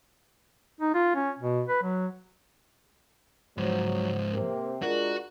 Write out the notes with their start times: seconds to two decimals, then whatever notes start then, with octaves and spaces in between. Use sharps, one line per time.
0.81 D#4
0.94 F4
1.15 C#4
1.39 B2
1.69 B4
1.83 F#3
3.58 G#2 F3 F#3 C5
4.32 C3 A#3 C4
4.82 G#3 D4 F4 F#4 A#4